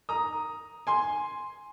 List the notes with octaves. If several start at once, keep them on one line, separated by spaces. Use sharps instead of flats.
A#5 D#6
G#5 C6